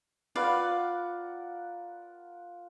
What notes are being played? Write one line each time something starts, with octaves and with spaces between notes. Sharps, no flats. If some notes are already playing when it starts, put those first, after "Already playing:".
F4 A#4 B4 D5 F5 F#5